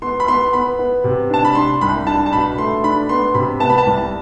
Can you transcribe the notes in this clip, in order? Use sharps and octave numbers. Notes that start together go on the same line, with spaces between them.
B3 C6
B5
B3 C6
B3 B5
B3
C3
D4 A5
B5
D4 C6
C2 B5
D4 A5
A5
B2 B5
A3 C6
D4 B5
B3 C6
C3 B5
B3 A5
B5
A5
C2